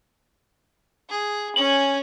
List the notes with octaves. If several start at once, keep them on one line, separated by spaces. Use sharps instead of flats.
G#4
C#4 G#5 F#7